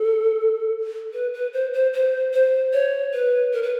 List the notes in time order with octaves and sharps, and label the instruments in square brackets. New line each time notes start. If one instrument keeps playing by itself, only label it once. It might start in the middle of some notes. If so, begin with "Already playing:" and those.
Already playing: [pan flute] A4
B4
B4
C5
C5
C5
C5
C#5
B4
A#4
B4